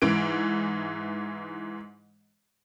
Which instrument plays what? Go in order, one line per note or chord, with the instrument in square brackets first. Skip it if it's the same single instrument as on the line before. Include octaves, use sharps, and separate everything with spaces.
[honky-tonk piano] G#2 E3 D7